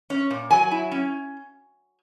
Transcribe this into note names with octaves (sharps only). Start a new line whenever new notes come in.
C#4
A#2
F#3 G#5
E4
C#4